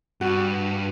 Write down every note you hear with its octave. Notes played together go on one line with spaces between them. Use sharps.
G2 F#4